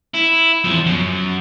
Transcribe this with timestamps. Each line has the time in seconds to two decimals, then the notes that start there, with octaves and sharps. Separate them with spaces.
0.14 E4
0.64 E2 F3
0.86 F#2